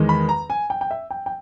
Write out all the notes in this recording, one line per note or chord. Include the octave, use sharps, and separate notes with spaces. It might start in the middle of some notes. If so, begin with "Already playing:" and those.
Already playing: E2 D#3 G#3
B5
A#5
G#5
G5
G5
E5
G5
G5